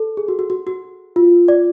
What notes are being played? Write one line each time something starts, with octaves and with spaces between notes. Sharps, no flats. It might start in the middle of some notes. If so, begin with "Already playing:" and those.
Already playing: A4
G#4
F#4
F#4
F#4
F#4
F4
D5